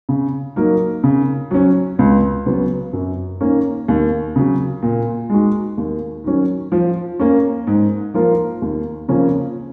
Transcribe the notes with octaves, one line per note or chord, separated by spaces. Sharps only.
C#3
F#3 A#3 D#4 A#4
C#3
F#3 C#4
C#2
C#3 F#3 B3
F#2
D#3 A#3 C#4
D#2
C#3 F#3
A#2
G#3 D#4 F#4
D#2
D#3 F#3 C#4
F3
A#3 C#4
G#2
F3 A#3 F4 A#4
D#2
C#3 F3 A#3 C#4